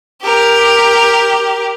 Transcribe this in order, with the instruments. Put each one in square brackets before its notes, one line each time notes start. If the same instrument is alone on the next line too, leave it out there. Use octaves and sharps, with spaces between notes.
[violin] G4 A#4